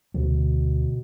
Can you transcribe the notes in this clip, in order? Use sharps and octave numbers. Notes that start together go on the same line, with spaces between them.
D2 B2